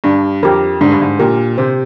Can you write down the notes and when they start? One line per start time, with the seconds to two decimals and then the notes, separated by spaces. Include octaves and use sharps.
0.04 G2 D4
0.43 F2 G4 A#4
0.81 G#2 D4
0.92 G2
1.01 G#2
1.19 A#2 G4 A#4
1.58 C3 C5